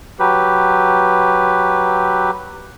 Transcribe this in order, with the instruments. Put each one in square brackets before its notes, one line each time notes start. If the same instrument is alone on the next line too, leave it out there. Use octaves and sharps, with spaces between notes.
[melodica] F#3 G4 B4